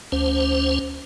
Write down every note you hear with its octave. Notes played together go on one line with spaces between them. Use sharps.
D2 C#4 C5